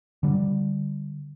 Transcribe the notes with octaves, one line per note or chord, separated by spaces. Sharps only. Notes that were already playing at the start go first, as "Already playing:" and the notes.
D3 G3